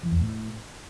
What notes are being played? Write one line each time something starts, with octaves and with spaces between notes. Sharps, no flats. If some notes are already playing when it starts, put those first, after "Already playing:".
E3
E2
A2